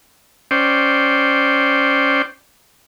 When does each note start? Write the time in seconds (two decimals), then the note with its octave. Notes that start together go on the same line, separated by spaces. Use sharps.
0.51 C#4 C5 D5 G5